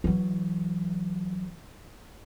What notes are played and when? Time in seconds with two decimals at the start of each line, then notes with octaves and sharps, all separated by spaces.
0.04 E3 F#3